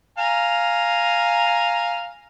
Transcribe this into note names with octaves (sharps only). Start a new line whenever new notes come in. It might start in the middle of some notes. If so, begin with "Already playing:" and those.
F5 G#5 A#5